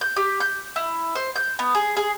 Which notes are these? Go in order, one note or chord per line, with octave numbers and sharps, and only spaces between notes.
G6
G4
G6
E4
C5
G6
B3
G#4
G#4